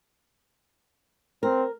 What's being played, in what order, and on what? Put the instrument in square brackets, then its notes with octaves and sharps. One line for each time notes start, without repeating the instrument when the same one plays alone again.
[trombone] C4 [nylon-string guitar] A#4